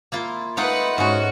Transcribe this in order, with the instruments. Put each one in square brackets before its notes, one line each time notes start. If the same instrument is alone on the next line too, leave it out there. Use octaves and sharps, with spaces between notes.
[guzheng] A#3 E4 F4
[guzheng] A3 D#4 F4 [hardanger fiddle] B4 F#5
[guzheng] G#2 C#4 [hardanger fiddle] F#4